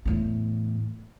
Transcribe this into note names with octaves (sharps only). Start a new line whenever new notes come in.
E2 A2